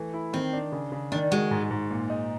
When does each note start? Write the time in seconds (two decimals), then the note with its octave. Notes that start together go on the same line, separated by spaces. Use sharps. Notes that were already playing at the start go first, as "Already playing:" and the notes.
Already playing: E3 A3
0.13 E4
0.33 D#3 C4
0.53 D4
0.72 C#3
0.92 C#3
1.12 D#3 D4
1.31 G#3 F#4
1.51 G#2
1.71 G#2
1.91 A#2
2.10 D#4